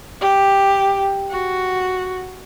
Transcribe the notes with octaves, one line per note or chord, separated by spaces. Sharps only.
G4
F#4